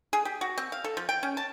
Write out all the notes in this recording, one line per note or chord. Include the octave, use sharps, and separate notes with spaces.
G#4
G4
F#4
C4
F5
A4
F3
G5
C#4
A5